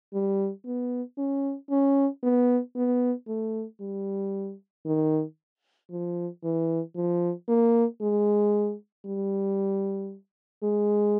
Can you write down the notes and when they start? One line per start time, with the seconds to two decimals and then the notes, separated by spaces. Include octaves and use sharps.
0.14 G3
0.65 B3
1.18 C#4
1.70 C#4
2.23 B3
2.76 B3
3.28 A3
3.81 G3
4.86 D#3
5.91 F3
6.44 E3
6.95 F3
7.48 A#3
8.01 G#3
9.06 G3
10.63 G#3